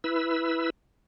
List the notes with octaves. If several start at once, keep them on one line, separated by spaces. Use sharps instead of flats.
E4 B4 E6